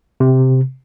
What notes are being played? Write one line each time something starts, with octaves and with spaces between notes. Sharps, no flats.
C3